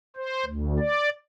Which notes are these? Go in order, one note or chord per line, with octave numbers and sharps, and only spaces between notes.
C5
D2
D5